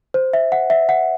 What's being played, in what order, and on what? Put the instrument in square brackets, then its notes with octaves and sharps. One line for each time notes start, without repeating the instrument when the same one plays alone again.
[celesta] C5
E5
F#5
E5
F#5